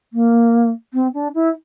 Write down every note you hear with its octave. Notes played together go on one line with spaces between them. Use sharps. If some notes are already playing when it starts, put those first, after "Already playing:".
A#3
C4
D4
E4